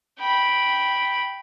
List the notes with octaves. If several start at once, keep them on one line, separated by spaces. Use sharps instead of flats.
G5 B5